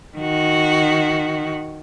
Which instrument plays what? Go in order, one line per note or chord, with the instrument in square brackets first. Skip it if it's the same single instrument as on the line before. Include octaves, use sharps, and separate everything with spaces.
[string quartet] D#3 F#4